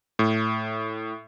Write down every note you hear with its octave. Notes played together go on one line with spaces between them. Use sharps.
A2